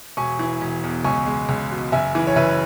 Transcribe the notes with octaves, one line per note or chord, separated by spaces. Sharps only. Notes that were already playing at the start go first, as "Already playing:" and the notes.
E1 G#5 C#6
E3
E1
E2
C#2 G#5 C#6
G#3
C#2
B2
F#1 E5 G#5
E3
C#5
F#1 B4 E5